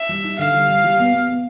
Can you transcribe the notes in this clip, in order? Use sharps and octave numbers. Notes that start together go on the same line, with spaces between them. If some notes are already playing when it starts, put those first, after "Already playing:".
Already playing: E5
G3
D#4
D3 F5
G3
G3
G3
B3
B3
B3